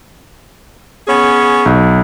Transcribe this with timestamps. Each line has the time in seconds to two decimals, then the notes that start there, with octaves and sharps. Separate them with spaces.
1.08 B3 C#4 G#4
1.66 B1